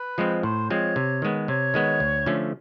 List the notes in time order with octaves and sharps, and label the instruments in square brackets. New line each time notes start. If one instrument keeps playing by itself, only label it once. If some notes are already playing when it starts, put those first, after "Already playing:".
Already playing: [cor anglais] B4
[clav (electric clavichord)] F3 G#3 C4
[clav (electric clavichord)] A2 [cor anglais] C5
[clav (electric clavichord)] F3 G#3 C4 [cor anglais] C#5
[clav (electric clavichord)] C3
D#3 G#3 B3
[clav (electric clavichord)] C3 [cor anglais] C#5
[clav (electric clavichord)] D#3 G#3 B3
D2
D3 F3 A3 C#4